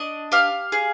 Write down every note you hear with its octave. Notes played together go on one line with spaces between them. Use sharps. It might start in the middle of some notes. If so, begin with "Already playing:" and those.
Already playing: D4 D#5
G4 F5
G#4